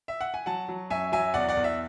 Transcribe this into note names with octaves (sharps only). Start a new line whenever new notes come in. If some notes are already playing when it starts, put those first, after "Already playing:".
E5
F#5
G#5
F#3 F#5 A5
F#3
F#2 E5 G#5
F#3 E5 G#5
E2 D5 F#5
D5 F#5
E2
E5